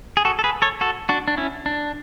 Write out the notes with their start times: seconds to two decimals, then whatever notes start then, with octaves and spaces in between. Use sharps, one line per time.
0.17 G#4
0.25 F#4 A4
0.39 A4
0.44 G#4 B4
0.62 A4 C#5
0.81 F#4 A4
1.09 D4 F#4
1.28 D4
1.37 C#4 E4
1.66 D4